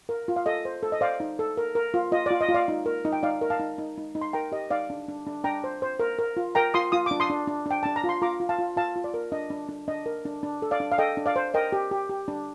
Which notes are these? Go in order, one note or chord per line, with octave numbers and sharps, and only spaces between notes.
A#4
F4
F5
A4 D#5
C5
A4
D#5
C5 D5 F5
D#4
A4
A#4
A#4
F4
F4 D#5
D5
F4
D#5
F4
D5 F5
D#4
A#4
D#4
G5
D#4 D5 F5
A#4
F5 A5
D#4
D#4
D#4
D#4
C6
A#4 G5 A#5
G4 D#5
D#4 D5 F5
D4
D4
D4
D4 G5 A#5
C5
C5
A#4
A#4
F4
A#4 G5 A#5
F4 C6 D#6
F4 D#6
D4 D6
C6 D#6
D4
D4
D4 G5
D4 A5
A#5
F4
C6
F4 A#5 D6
F4
F5 A5
F4
F4 F5 A5
F4
D5
A#4
D4 D#5
D4
D4
D4 D#5
A#4
D4
D4
A4
D5 F5
D4
F5
A4 D#5 G5
D4
D5 F5
C5
A#4 D#5 G5
G4
G4
G4
D4